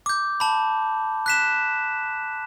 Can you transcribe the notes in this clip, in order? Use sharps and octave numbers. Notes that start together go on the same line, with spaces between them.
D6 G6
A5 B5
F#6 B6 E7